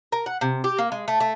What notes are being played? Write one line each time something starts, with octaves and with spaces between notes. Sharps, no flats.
A#4
F#5
C3
G4
A#3
G#3
A3
A3